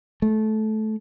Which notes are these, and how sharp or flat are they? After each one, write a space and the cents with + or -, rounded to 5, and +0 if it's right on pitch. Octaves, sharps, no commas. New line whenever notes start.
A3 -20